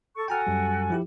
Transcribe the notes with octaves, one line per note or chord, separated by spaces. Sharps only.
A4 C#6
F#4 A4 G5 G#5 A#5 F6
F#2 G3
F3 E4 G4